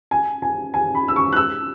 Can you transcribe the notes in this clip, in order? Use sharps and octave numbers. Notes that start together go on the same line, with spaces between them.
G#5
G#5
G#5
B5
E6
C#6
F#6
E6